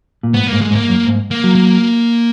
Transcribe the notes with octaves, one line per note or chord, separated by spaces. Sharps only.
A#2
G#2 B3
A#3
G#2
G#3
G#2
A#3
F#2
G#2
A#3
F#3
A#3